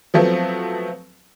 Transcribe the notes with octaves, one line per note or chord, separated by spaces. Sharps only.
F3 F#3 A3 B3 C4